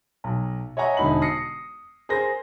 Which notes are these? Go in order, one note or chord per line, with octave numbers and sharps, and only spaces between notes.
B1
C#5 D#5 E5 F#5 G#5 A#5
E1 D3 D#4 E5 B5 F#7
D#6 A#6 C7 C#7
G#4 A#4 C5 A#6